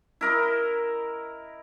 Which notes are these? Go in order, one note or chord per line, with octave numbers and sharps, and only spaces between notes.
E4 A#4 D#5